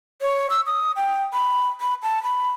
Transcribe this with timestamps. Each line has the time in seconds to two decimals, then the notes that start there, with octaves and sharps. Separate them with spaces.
0.21 C#5
0.50 E6
0.66 D#6
0.96 G5
1.33 B5
1.81 B5
2.03 A5
2.23 B5